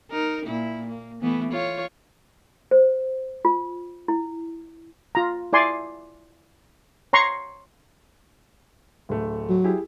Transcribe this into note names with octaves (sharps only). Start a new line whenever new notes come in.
D#4 A#4
A#2 E4
A#3
E3 A3 B3
F4 C#5
C5
F4
E4
F4 A#5
E4 D5 G#5 C6
C#5 A#5 C6 C#6
D1 A3
F#3
E4 G4 G#4